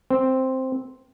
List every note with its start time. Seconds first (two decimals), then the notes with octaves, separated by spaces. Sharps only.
0.10 C4